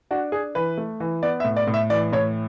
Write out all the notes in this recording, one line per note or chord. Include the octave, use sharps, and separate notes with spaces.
D4 F#4
D4 G#4
E3 B4
A3
E3
B3 D5
E5
A2
D5
A2
E5
E3 D5
A2 C#5